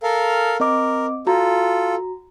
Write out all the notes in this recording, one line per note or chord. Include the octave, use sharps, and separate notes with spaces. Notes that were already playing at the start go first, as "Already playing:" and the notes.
A4 A#4 F5
C4 A#4 D#5 D6
F4 F#4 A4 A#5